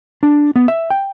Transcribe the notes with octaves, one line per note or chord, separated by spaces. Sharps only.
D4
B3
E5
G5